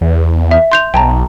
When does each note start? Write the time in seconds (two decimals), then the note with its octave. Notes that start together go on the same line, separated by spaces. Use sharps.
0.01 E2
0.51 E5
0.72 C6 G6 F7
0.94 B1 G5 A5 A#5